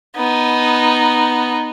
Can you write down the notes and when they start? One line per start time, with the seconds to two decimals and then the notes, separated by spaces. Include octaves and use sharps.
0.16 B3 D#4